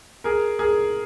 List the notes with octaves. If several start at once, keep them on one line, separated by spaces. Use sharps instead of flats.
G#4 A#4
G#4 A#4